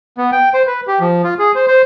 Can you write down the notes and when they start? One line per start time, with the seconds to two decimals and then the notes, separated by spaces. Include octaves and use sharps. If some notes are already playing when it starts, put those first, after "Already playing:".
0.18 B3
0.32 G5
0.54 C5
0.67 B4
0.87 G4
1.00 F3
1.24 F4
1.39 G#4
1.55 C5
1.68 C5